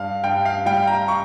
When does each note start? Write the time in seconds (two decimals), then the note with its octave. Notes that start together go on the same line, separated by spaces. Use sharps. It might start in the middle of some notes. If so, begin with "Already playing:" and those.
Already playing: G2 G3 F5
0.24 G2 G5
0.45 F5
0.66 G3 G5
0.87 A#5
1.08 C#6